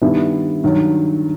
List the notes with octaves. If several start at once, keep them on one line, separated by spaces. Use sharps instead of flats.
G2 D#3 G3 B3 E4
G2 D#3 F#3